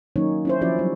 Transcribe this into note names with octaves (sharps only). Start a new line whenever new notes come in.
D#3 F#3 A#3 C#4 D#4 C#5
C#4 E4 C5
F3 C#4 E4 F#4 D5
F#3 G3